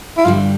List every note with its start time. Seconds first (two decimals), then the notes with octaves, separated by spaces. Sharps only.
0.17 E4
0.25 G2 D3 G3 F4